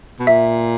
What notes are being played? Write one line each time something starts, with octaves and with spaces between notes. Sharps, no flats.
B2
A#2 E5